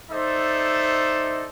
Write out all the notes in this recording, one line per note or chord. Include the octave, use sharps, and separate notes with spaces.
D#4 A4 C5 D5 E5